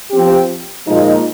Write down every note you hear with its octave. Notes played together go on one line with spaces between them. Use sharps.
F3 C4 G4
A#2 F3 G#3 D#4